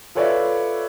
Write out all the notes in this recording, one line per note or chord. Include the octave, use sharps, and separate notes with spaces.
F4 A4 B4 C#5 D5 E5